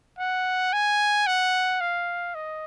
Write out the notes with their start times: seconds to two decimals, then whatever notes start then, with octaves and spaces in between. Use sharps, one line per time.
0.19 F#5
0.73 G#5
1.27 F#5
1.81 F5
2.35 D#5